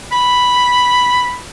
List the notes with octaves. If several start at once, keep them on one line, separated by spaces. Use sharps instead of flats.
B5